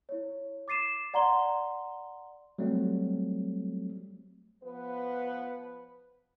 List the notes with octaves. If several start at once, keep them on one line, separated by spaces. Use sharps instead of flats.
E4 C#5
D6 A6 C7 D#7 E7
D5 F#5 A#5 C6 G7
F#3 G3 A3 C4
F3 B3 B4